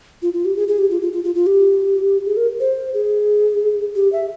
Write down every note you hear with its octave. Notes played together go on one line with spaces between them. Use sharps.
F4
F4
G4
G#4
G#4
G4
F4
F4
F4
F4
F4
G4
G#4
A#4
C5
G#4
G4
E5